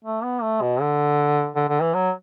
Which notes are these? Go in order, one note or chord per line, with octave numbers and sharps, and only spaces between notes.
A3
B3
A3
B2
D3
D3
D3
E3
F#3